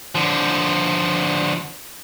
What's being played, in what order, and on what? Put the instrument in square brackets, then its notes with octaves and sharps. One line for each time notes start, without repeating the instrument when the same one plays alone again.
[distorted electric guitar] D3 F3